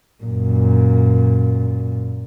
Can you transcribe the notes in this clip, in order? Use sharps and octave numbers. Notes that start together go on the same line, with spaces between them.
F#2 A#2